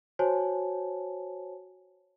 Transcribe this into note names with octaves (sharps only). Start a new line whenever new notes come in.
F#4 C5 C#5 G#5 A5